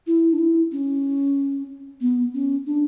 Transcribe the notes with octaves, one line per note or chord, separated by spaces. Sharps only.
E4
D4
E4
C#4
B3
C#4
D4